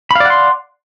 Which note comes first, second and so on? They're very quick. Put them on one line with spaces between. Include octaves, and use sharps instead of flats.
B5 F5 D5 F#5 C6